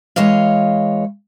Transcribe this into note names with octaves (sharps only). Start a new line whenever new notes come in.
E3 G#3 C#5 D#5 F5